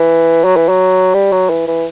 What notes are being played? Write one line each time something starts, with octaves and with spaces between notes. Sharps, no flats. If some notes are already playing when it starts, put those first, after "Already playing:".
Already playing: E3
F#3
E3
F#3
G3
F#3
E3
E3